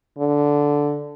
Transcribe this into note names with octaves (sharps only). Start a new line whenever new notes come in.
D3